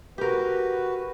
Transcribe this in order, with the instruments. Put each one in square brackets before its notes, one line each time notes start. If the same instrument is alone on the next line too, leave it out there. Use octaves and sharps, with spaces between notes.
[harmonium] F#4 B4 [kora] G4 A#4